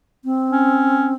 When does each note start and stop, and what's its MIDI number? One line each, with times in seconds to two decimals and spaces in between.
0.25 1.15 60
0.50 1.14 61